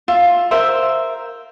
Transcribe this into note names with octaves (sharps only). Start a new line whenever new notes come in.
F4 E5
A#4 C5 E5